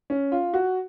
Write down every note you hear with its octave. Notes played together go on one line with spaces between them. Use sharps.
C#4
F4
F#4